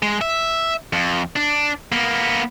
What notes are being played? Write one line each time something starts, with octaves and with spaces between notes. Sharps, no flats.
G#3
E5
F2
D4
A#3 B3